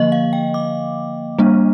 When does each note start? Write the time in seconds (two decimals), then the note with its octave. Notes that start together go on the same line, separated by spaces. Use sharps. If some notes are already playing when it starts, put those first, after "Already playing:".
Already playing: D3 F3 A#3 D#5
0.12 F5
0.33 G5
0.54 D6
1.39 G3 A#3 D4